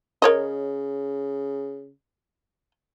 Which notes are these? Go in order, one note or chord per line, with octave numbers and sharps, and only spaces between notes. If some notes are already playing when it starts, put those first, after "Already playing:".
C#3 A#4 C#5 D#5